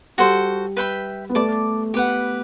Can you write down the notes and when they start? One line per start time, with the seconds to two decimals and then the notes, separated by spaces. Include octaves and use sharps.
0.18 G3 F#4 A4 C5
0.77 B4 E5 G5 B5
1.30 B3
1.35 A3 D5 A5 D6
1.94 B3 G4 B4 F#5